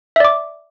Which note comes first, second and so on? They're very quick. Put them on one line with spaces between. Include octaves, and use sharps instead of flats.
E5 D5 D6